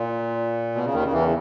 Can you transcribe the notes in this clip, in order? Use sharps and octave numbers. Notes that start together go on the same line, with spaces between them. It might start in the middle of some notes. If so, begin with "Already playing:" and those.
Already playing: A#2
B2
C#3
D#2 D#3
C#3
E2 E3